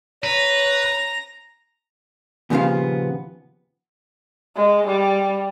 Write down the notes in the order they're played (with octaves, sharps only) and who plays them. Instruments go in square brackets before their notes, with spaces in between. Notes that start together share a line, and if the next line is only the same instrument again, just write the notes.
[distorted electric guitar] B4 [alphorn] C#5 [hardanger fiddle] A#5
[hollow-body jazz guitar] D#2 A#2 C#3 F3 B3 F5
[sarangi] G#3
G3